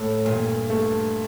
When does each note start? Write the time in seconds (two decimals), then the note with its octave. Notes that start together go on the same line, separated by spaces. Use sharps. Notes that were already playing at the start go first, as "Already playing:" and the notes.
Already playing: A2 A3 A4
0.25 G2 A#2
0.70 A3